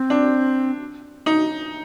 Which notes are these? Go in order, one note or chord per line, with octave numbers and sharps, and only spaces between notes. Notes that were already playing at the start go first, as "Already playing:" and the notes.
Already playing: C4
D4
D#4